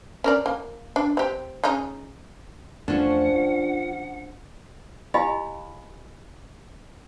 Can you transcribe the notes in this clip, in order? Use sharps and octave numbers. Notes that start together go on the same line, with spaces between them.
C#4 A#4 D5
A#3
D4
C4 G4
C#3 C#4 D#4
E2 F3 A3 C#4 D4 F#5 C#6
F4
E4 G4 D#5 F5 G#5 B5